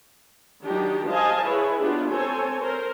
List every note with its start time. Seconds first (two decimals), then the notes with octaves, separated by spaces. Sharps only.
0.65 D#3 F#3 D4 D#4 G4
1.08 C5 D#5 F5 G#5 A5
1.45 E4 G#4 B4 C#5
1.81 B3 D4 F4 G4
2.10 C4 A4 C5 C#5 G#5
2.61 A#4 C5